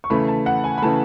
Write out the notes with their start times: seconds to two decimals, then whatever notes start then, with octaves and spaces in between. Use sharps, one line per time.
0.04 C#6
0.10 C#3 E3 A3 B5
0.28 A5
0.46 F#5
0.64 G#5
0.78 B5
0.82 C#3 E3 A3 A5